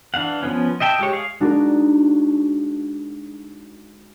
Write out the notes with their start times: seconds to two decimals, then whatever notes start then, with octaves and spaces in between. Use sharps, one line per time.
0.14 E3 D4 F5 F#5
0.43 F3 B3 C#4
0.80 D#5 E5 G5 A5
0.99 G#3 G4 C#5
1.13 G#4 F5
1.40 G#3 D4 D#4 F#4 A#4